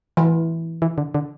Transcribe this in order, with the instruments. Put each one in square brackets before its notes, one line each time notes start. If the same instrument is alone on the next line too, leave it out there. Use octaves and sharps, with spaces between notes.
[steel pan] E3
[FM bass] E3
D3
D3